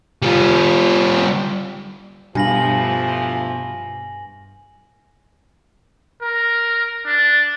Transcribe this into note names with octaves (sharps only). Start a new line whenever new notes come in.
G3 F4
D2 G2 B2 E3 F3 G#5 A#6 F#7
A#4
D4